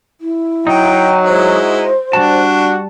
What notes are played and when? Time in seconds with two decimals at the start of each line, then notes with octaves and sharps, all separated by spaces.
0.21 E4
0.67 F#3 D#4 G5
1.24 G#3 E4 F#4 C5
2.13 G3 D4 F#4 A5